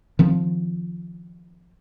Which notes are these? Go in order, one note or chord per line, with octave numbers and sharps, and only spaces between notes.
D#3 F3 C4